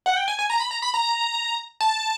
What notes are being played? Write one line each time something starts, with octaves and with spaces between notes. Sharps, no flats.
F#5
G5
G#5
G#5
A#5
B5
A#5
B5
A#5
A5